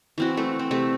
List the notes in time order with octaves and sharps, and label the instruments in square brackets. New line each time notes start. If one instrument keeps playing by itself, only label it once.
[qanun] E3 C4 F#4
A3
C4
C3 A3